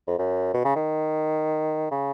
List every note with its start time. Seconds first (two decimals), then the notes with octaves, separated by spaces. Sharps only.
0.07 F2
0.19 F#2
0.54 B2
0.64 C#3
0.76 D#3
1.91 C#3